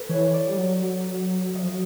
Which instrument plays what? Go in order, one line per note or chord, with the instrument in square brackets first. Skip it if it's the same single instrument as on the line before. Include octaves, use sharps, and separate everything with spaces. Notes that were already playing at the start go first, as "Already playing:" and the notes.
Already playing: [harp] A4 B4
[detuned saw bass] E3 [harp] C#5
[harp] D5
[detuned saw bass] G3
F#3
[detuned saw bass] F#3 [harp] D#5
[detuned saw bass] F3
F#3